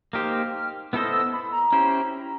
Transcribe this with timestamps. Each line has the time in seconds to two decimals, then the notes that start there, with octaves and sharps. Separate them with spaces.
0.13 A#3 D#4 G4 C5 F6
0.93 B3 E4 A4 C5 D#5 E6
1.12 E6
1.33 B5
1.52 A#5
1.72 C#4 E4 G4 C5